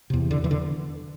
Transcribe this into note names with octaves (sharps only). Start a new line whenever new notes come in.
E2 C3
D3
E3
D3